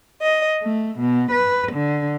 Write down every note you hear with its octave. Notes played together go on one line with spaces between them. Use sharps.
D#5
A3
B2
B4
D3